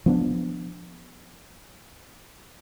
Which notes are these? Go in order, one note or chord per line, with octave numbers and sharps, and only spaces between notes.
F3 B3 D4